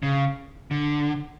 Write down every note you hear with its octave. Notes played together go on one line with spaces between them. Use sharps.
C#3
D3